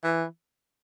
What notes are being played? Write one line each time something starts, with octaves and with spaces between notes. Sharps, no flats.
E3